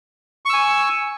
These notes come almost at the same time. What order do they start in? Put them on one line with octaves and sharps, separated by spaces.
C#6 E6 G#5